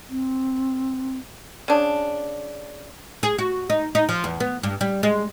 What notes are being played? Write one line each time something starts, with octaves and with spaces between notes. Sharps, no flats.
C4
C#3 D4
G#4
F#4
D#4
D#4
F3
E2
B3
G2
G3
G#3